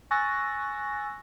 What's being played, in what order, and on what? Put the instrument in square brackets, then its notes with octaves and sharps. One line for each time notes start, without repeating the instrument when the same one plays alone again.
[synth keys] G#5 C#6 E6 F#6 A6 A#6